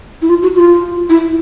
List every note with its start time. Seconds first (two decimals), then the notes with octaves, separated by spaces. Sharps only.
0.22 E4
0.29 F4
0.42 F#4
0.55 F4
1.09 E4